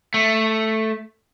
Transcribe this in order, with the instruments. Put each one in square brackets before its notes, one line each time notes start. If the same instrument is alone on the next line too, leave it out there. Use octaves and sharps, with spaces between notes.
[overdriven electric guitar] A3